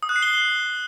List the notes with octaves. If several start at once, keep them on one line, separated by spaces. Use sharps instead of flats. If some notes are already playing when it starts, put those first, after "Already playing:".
D#6
F#6
C7
G7